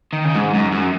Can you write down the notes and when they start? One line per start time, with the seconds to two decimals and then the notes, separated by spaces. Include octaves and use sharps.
0.13 D#3
0.25 C#3
0.36 G#2
0.54 F#2
0.72 F#2